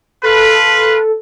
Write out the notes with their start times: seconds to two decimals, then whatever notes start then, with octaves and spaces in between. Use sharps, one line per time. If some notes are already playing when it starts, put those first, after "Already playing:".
0.23 F4 A4 B4